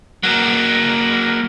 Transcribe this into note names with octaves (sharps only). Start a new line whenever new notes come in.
F#3 A#3